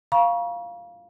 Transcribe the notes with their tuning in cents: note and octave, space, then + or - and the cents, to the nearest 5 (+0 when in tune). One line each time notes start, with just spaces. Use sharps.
F5 +0 A#5 +45 C#6 +10